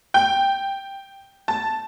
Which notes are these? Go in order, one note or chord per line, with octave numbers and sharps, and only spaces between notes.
G5
A5